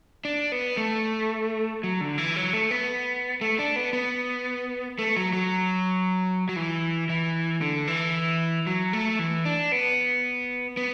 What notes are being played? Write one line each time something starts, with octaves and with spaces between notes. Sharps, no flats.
D4
B3
A3
F#3
D3
E3
F#3
A3
B3
A3
D4
B3
B3
A3
F#3
F#3
F#3
E3
E3
D3
E3
F#3
A3
E3
D4
B3
B3